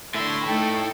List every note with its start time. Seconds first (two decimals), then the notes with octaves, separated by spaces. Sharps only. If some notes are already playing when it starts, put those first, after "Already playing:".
0.15 A2 D3 E4 E5 C6
0.46 A3 D#4 A4 G5